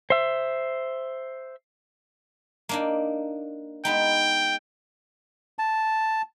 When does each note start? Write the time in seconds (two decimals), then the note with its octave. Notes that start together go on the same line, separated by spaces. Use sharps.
0.10 C5 E5
2.69 A#3 D4 D#4
3.85 G#3 B3 D#4 G5
5.59 A5